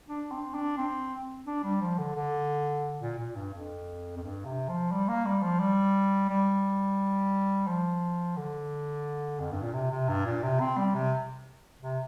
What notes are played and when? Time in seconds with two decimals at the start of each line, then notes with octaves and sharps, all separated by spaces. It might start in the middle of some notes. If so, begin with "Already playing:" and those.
0.09 D4
0.32 C4
0.55 D4
0.78 C4
1.46 D4
1.64 G3
1.81 F3
1.98 D3
2.15 D3
3.02 A#2
3.19 A#2
3.36 G2
3.54 F2
4.17 F2
4.23 G2
4.45 C3
4.68 F3
4.92 G3
5.08 A#3
5.26 G3
5.43 F3
5.60 G3
6.30 G3
7.68 F3
8.37 D3
9.40 F2
9.52 G2
9.63 A#2
9.74 C3
9.92 C3
10.09 G2
10.26 A#2
10.43 C3
10.61 C4
10.78 G3
10.95 C3
11.81 C3